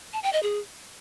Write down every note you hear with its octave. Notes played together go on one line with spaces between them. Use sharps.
A5
G5
D#5
G#4